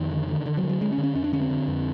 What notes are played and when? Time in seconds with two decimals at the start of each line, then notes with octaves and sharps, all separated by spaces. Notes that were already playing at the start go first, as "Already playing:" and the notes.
Already playing: F2 D#3
0.11 D3
0.28 D3
0.46 D3
0.57 F#3
0.63 D3
0.69 F#3
0.81 D3 G#3
0.92 C#4
0.98 D3
1.03 C#4
1.15 F2 C#4
1.24 D4
1.33 D3 C#4
1.41 C4
1.50 D3
1.68 F2